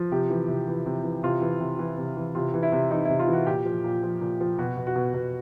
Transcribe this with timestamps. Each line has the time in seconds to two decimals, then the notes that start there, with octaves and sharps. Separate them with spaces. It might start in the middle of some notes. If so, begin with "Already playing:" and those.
Already playing: F3
0.12 C3 G4
0.30 E3
0.48 C3
0.68 E3
0.86 C3
1.04 E3
1.23 C3 F4
1.42 E3
1.60 C3
1.79 E3
1.98 C3
2.17 E3
2.35 C3 F4
2.54 E3
2.63 E4
2.72 C3
2.91 E3 D#4
3.05 C3 E4
3.19 F4
3.28 E3
3.33 F#4
3.47 A#2 G4
3.65 F3
3.84 A#2
4.03 F3
4.21 A#2
4.41 F3
4.59 B2 F#4
4.77 B2
4.87 F#4
4.96 B2
5.14 B2